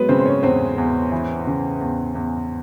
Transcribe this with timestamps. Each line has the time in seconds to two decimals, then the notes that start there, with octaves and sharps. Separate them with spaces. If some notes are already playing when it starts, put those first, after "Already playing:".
Already playing: F#3 G#3 B3 G#4 B4
0.09 C#3 C4 C5
0.19 C5
0.25 C#4 C#5
0.43 E2 C4 C5
0.78 E2
1.12 E3
1.47 C#3
1.81 E2
2.15 E2